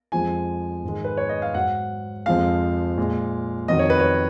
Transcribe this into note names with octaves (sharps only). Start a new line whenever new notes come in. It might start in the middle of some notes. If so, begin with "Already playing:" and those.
F2 F3 G#3 G#5
G#2 D#3 G#3
B4
C#5
D#5
F5
G#2 F#3 F#5
F2 F3 G#3 F5
A#2 G#3
F2 D#3 F#3 D#5
C#5
B4
C#5